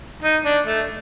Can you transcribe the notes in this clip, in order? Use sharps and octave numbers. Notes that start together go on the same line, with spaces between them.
D#4
D4
A3